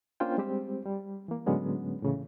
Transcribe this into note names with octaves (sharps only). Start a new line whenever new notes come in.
A#3 C#4 D4 F4 C5 G5
G3 G#3 C4 G4 C5
G3
E3 A#3
A2 D3 F#3 G#3 B3 C#4
A2 C#3 E3